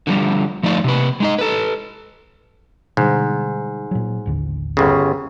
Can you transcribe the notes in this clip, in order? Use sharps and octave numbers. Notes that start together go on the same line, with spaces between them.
D3 F3 G3
F3 A3 D#4 D5
C3 B4
G#3 D#4 D#5
A4 B4
G#2 B2 D3 G3
A#2 F#3
A1 D#2 D3
G1 C#3